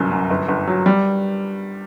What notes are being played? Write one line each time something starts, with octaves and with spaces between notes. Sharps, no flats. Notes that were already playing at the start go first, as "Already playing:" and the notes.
Already playing: G1 C2 F#2
F#2
G1
G1
F#3
G3